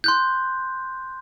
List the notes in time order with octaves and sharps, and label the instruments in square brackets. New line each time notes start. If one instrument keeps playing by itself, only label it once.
[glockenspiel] C6 F#6 G6